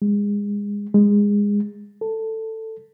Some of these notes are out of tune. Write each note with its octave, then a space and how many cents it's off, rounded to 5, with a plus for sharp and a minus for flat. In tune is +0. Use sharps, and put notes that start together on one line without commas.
G#3 -25
G#3 -20
A4 +15